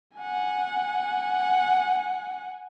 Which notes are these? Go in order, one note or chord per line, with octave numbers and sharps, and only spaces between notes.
F#5 G#5